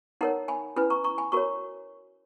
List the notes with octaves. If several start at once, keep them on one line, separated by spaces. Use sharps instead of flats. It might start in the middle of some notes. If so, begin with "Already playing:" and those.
D#4 A#4 C#5 F#5 A#5
G#5 B5
C#4 E4 B4 G#5 B5
A#5 C#6
A#5 C#6
G#5 B5
F#4 A#4 C#5 A#5 C#6